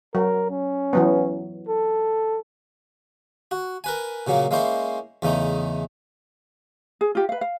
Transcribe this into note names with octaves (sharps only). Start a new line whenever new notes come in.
F#3 A#4
C#4
E3 F#3 B3
A4
F#4
A#4 B4 G#5
A#2 C#3 F#3 A#3
G#3 A#3 C#4 E4 C5
E2 C#3 A3 D#4
G#4
F4 G4
B4 F5
F5